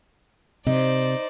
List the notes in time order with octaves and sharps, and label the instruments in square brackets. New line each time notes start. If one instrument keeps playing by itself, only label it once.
[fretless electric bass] C3 [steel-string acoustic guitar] D#4 [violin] C5 D5